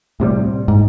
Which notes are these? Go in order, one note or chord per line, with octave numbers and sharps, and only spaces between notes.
A2 C3 F3 G3
G#2